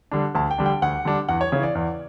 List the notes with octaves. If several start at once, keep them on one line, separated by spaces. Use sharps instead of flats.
D3 G3 D4
D2 A5
G5
D3 G3 D4
G5
D2 F#5
D3 G3 D4
E2 F#5
C#5
C#3 E3 C#5
D5
E2 D5